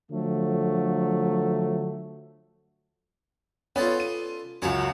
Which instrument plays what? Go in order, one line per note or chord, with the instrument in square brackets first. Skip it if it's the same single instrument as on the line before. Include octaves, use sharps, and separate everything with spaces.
[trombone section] D3 F3 F#3 A3
[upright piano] B3 C#4 [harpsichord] F4 A4 D5
[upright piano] D#7
[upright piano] C#2 F#2 [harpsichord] F#4 C#5 D6